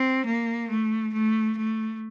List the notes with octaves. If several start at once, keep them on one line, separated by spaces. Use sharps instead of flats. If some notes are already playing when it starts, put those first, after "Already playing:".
Already playing: C4
A#3
A3
A3
A3